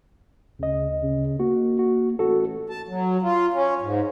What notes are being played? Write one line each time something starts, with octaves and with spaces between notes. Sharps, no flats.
D2 C#3 D#5
C#3
A#3 F#4
F#4
A1 F#4 A4
A5
F#3
F4
C#4
G#2